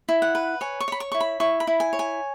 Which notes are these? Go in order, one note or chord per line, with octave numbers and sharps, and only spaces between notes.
E4
F#5
B4
C#5 G#5
C#6
C#5 B5
C#6
E4 C#6
B5
E4 C#6
B5
E4
G#5
C#5
G#5